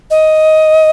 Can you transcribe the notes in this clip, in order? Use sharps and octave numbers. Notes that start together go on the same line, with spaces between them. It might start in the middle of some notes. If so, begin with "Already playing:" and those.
D#5